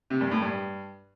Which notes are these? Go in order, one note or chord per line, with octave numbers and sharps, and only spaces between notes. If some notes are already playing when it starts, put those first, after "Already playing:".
C3
G2
A2
G2